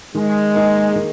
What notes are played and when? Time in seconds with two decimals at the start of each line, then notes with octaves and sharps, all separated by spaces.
0.14 D#3 G#3
0.54 A#3 D#4 G#4
0.96 D#3